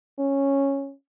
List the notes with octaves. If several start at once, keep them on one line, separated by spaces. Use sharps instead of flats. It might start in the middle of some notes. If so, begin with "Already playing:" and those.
C#4